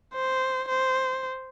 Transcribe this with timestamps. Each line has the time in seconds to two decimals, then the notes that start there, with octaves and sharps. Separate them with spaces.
0.14 C5
0.69 C5